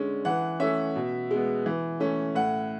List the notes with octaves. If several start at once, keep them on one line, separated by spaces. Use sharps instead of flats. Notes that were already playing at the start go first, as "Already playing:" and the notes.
Already playing: D3 G#3 C#4
E3 F#5
A3 C#4 E5
B2
G#3 B3
E3
A3 C#4
A2 F#5